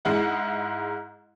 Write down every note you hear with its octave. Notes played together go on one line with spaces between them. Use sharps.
G#2 G#3 E4 F#5